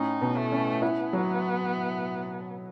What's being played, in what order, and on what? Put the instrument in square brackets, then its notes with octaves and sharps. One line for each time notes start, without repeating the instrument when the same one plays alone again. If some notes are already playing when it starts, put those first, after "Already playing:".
Already playing: [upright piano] A2 C#4 [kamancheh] D#4
[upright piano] B2
[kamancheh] A3
[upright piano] C#4
[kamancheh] B3 [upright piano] E4
[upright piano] F#3